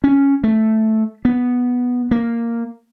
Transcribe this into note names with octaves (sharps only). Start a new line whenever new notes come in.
C#4
A3
B3
A#3